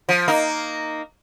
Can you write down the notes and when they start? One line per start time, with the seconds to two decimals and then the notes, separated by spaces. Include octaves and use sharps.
0.09 F3
0.28 A#3 D#4